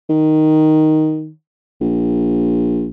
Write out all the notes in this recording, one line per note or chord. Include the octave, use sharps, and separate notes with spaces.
D#3
A#1